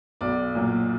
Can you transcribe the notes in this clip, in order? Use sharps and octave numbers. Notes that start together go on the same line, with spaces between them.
B1 D5
A#2 F#3